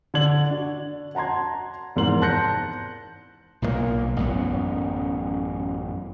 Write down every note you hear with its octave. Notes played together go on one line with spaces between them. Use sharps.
D3 D4 D5 G#6 F#7
D4 F#4
F#5 A5 A#5 C6 G#6
F1 E2 G#2 A#4 C6 F#7
A5 C6 F#6 G6 A#6 C#7
B1 A#2 D3 A#3
A1 F#2 B3